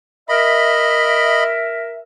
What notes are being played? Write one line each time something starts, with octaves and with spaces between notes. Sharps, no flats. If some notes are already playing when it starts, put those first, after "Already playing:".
A#4 D#5 E5 B5